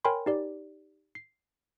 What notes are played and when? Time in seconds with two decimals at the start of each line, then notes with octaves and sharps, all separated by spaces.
0.05 A#4 C#5 G5 G#5 B5 C6
0.26 D#4 G4 D5
1.15 C7